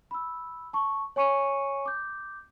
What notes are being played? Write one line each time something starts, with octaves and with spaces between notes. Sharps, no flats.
B5 E6
A5 C#6
C#5 G#5 C#6 C#7 D#7
D6 G6